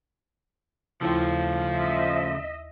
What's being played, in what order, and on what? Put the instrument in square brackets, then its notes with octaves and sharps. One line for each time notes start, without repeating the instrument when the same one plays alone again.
[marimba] D#2 E4 [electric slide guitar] C#3 A3 C#4 [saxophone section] F3
[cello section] D#5 E5